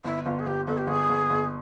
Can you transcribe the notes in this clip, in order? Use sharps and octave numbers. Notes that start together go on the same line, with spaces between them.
G1 E4
G1 F4
G#4
G1 G4
G1 A4
G4
G1 G#4
G1
G1